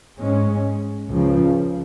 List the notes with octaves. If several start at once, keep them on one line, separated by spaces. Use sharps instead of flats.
G#2 G#3 C#4
C#2 C#3 F3